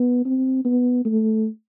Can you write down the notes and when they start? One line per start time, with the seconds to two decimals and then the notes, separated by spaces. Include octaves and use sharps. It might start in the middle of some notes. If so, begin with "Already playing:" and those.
Already playing: B3
0.25 C4
0.65 B3
1.05 A3